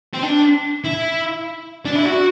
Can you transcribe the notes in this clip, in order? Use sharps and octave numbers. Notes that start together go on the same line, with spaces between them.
C4
D4
E4
D4
E4
F#4